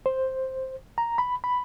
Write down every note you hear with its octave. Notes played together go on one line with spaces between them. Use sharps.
C5
A#5
B5
B5